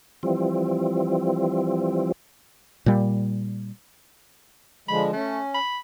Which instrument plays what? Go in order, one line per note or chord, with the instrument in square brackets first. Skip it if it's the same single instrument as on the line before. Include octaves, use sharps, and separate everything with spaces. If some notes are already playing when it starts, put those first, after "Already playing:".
[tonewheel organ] E3 F3 G3 C4
[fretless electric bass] A#2 G3
[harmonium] D3 F3 G#3 [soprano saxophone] B5
[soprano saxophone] A3 [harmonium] C#4
[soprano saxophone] B5